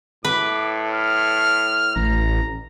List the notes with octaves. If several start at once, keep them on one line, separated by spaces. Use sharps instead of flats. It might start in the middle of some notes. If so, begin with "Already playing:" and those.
A2 B4 D6
F6
A1 A#5